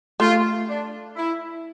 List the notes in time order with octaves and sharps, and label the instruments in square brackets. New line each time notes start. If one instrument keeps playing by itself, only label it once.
[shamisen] A3 [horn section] F4
[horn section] D4
E4